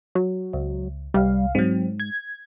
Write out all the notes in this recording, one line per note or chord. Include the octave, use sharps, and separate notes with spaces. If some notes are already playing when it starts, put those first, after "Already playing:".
F#3
C#2
C2 G3 F5
G#2 F#3 C4
G#6